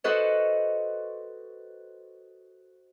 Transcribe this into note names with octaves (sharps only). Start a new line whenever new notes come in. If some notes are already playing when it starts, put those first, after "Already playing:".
F#4 A4 B4 C5 D#5 F#5